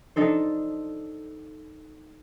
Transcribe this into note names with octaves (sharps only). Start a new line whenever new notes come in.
D4 D#4 A4 C5